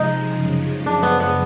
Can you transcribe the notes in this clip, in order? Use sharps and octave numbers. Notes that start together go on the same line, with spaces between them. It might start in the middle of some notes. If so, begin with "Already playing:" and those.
Already playing: C3 F3 G#3 D#4
F#2 C#3 F3 G#3
D4
B3
B3